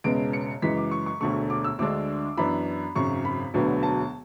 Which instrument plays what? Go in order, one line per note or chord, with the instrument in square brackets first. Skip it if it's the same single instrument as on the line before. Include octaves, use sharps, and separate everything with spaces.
[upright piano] E1 E2 C#3 G#3 B3 D7
C#7
F#2 C#3 E3 G#3 B6
D6
C#6
C#6
E1 D2 D3 A3 C#6
D6
E6
D2 D3 G#3 D4 D6
F#2 E3 B3 D4 B5
G#1 F#2 C#3 C#6
B5
E1 D2 D3 F#3 B3
A5